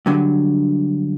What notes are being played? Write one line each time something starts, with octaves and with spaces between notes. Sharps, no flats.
G2 D3 F#3